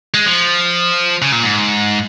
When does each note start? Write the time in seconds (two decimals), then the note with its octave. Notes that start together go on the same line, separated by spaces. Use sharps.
0.14 G#3
0.26 F3
1.22 C#3
1.32 A#2
1.43 G#2